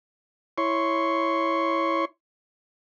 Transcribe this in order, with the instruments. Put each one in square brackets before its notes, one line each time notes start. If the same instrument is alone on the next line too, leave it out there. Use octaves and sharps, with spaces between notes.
[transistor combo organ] E4 C#5 C6 C#6